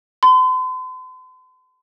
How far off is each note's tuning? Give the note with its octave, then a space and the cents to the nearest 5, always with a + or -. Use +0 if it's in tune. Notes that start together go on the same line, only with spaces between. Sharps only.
C6 -45